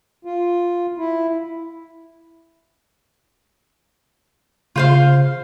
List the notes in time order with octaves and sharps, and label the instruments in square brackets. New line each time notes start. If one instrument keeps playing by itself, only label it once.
[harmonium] F4
E4
[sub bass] C#3 [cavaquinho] F4 C5 F5